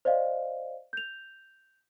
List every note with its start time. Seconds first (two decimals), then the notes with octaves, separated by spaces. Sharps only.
0.05 C5 D5 D#5 F5
0.93 G6 F7